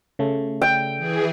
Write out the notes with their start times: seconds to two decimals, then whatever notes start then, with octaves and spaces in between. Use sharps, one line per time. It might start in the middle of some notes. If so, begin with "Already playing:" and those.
0.19 C#3 A3
0.62 G5
0.97 E3 G#4